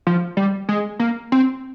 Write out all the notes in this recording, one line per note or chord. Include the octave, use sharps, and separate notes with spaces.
F3
G3
G#3
A#3
C4